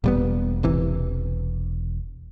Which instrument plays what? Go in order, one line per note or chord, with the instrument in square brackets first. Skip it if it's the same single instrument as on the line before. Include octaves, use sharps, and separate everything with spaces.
[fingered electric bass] E1 [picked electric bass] A#2 G3 B3
[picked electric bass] A#1 C3 E3